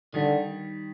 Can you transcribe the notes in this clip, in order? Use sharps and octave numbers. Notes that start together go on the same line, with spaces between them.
D3 D#3 G3